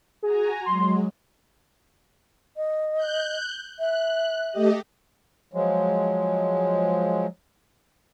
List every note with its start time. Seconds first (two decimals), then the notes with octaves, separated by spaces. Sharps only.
0.23 F#4 G#4 G#5 A#5
0.66 F#3 G#3 C6
2.57 D#5
2.97 F#6 G6
3.79 E5 F#6
4.51 A3 G4 D#5
5.53 F3 F#3 G#3